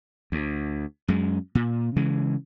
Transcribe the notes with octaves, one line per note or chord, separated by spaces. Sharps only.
D2
F#2 G#3
A#2
C#3 E3 G#3